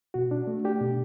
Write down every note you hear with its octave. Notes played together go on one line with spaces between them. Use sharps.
B2 F#4
D4
A3
D4 G4
B2